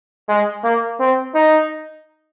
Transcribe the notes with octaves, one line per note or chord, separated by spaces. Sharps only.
G#3
A#3
C4
D#4